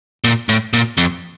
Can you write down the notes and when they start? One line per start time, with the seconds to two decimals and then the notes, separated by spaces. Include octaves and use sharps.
0.24 A#2
0.49 A2
0.73 A#2
0.98 F2